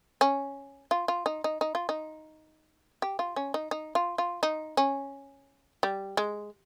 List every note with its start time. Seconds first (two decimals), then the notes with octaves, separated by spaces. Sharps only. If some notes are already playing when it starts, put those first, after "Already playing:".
0.21 C#4
0.91 F4
1.08 F4
1.26 D#4
1.44 D#4
1.61 D#4
1.75 F4
1.89 D#4
3.02 G4
3.19 F4
3.36 C#4
3.54 D#4
3.71 D#4
3.95 F4
4.18 F4
4.43 D#4
4.77 C#4
5.83 G3
6.17 G#3